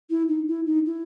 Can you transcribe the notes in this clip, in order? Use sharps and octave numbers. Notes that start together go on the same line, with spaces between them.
E4
D#4
E4
D#4
E4